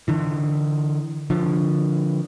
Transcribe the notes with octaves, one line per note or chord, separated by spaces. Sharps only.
D3 E3
D3 F3